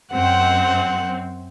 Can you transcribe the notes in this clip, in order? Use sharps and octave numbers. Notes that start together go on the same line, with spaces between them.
F#2 C4 F#5